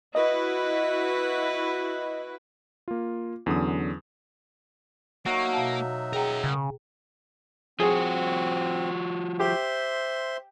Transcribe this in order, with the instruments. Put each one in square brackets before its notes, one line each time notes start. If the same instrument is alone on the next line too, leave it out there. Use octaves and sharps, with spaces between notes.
[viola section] E4 F#4 B4 [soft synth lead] D#5
[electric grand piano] A#3 F4
E2 D3 F#3 C#4 D#6
[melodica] F#3 D#4 E5 [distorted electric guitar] A#3 [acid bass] F#4
[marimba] B2 F5 A5
[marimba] G#4 G5 A#5 [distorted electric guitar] A#4 F#5
[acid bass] C#3
[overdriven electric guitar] F3 F#4 [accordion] C4 [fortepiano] G#4
[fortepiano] G4 [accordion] C5 E5 C6